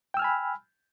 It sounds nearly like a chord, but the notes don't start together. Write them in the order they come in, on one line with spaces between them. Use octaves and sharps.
G5 E6 F6 G#5 B5